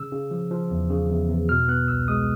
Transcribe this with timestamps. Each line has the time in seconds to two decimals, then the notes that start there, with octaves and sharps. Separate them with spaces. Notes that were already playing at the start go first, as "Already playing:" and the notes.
Already playing: C#3 E6
0.12 C#3
0.31 F3
0.51 F3
0.71 E2
0.90 C#3
1.09 E2
1.30 E2
1.49 B2 F6
1.68 B3 F#6
1.88 C2 E6
2.08 G#3 D#6